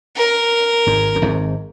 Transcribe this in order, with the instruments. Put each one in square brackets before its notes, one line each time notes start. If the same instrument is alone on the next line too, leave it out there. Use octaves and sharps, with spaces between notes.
[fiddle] A#4
[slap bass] G#1 G#2
F#2
G#1 G#2